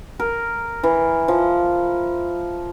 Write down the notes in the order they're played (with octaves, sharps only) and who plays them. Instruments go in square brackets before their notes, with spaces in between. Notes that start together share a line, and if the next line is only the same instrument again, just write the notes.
[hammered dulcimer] A#4
E3
F3